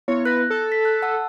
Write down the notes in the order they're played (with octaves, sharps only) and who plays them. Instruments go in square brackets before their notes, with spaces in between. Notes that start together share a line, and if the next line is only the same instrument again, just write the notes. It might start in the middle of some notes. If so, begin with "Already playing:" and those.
[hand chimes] B3 E4 [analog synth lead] C#5
[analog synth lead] B4 [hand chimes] F#6 A#6
[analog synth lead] A4
[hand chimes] B6
F#6
F#5 A5 E6